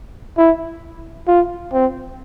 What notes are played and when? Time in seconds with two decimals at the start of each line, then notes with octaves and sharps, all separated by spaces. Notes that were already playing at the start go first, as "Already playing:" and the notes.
0.38 E4
1.28 F4
1.73 C4